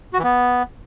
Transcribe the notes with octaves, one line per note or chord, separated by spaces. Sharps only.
F#4
E3
B3